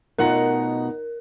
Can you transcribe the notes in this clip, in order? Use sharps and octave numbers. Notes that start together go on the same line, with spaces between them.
B2 A3 D#4 F4 A#4 F#5 A#5